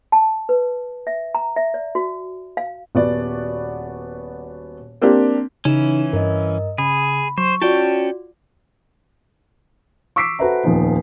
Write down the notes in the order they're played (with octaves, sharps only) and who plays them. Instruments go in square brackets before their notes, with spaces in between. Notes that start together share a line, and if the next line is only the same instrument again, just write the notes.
[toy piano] A5
B4
E5
A#5
E5
D5
F#4
F5
[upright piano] D#1 B3 F#4 D5
A#3 C4 D4 G4
[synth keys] C#3 D#4 E7 [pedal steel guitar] E3 C#4
[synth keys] G2 [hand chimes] A#4 D#5
[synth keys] C#3 [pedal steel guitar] G#4 [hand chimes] B5
[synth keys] F#3 [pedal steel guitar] C5 [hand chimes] C#6
[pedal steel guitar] C#4 G5 A5 [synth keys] F4 [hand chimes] F#4 D5
[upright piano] C#6 D6 E6 B6 C7 D7
F#4 A4 B4 C5 E5 A#5
D#1 F2 F3 B3 D#4